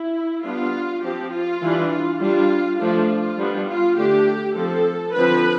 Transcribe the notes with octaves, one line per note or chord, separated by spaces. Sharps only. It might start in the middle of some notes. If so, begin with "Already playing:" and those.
Already playing: E4
G3 B3 D4 F4
F3 C4 G4
F4
E3 G3 D4
F4
G3 D4 F4
F3 A3 D4 F4
G3 B3 D4
F4
D3 A3 D4 G4
F3 C4 A4
D3 F3 C4 B4